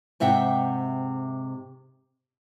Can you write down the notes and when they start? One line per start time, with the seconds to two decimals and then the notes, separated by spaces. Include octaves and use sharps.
0.20 G#2 C3 E5 F#5 G5